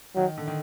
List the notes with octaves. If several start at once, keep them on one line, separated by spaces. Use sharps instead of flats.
D#3 F#3
D3
D#3